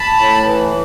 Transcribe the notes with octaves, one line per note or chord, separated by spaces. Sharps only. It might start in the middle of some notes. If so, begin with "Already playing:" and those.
Already playing: A5 B5
A2
E3